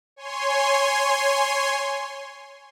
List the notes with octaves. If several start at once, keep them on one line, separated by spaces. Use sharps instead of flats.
C#5 G#5 C6